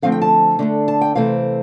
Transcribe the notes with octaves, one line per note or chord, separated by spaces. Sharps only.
D3 F3 A3 C4 F5
G5
A5
D3 A3 D4
A5
G5
C3 E3 A3 C4 F5